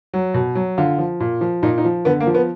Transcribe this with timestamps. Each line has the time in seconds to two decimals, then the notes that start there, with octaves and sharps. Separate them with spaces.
0.14 F#3
0.34 B2
0.55 F#3
0.78 D3 F4
0.99 F3
1.20 A#2
1.41 F3
1.63 A#2 D#4
1.78 D#4
1.85 F3
2.05 D3 B3
2.20 A#3
2.27 F3
2.34 B3